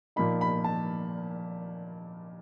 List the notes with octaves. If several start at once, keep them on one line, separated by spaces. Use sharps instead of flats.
A#2 F3 A#3 D#4 B5
B5
A5